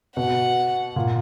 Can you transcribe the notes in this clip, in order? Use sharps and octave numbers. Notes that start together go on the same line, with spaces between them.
B2 F#5
A#2